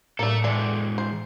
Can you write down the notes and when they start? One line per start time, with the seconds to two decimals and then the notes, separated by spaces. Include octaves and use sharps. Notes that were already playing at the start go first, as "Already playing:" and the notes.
0.19 A2 G3 A#3 A4 E5
0.44 E3 G#3 A4 D5 A5
0.98 C5